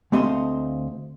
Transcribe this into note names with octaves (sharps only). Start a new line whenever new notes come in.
D2 A3 C4 D#5 F5 C6